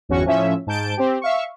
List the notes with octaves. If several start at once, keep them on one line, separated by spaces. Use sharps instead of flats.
G1 E2 C#4 F#4 C#6
A2 F3 C#4 E5
G#2 A5 G6 D7
C4 G4
E5 F5 C#6